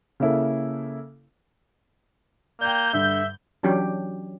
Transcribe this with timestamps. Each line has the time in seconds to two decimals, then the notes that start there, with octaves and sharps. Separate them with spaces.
0.20 C#3 A#3 E4 A4
2.61 A#3 D5 G5 G6
2.93 G2 D3 E5
3.63 E3 F#3 C#4 D4 G4